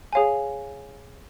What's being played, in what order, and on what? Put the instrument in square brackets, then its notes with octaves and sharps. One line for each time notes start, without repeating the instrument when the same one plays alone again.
[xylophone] G#4 C#5 F5 G#5